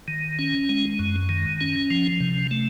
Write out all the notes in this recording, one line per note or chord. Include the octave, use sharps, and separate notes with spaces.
D#3
C#4
G#3
F#2
D#3
C#4
F3
C3
A3